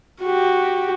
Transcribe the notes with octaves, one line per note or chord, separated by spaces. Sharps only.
F#4 G4